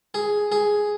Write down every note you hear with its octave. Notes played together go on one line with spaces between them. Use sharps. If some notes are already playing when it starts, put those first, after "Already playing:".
G#4
G#4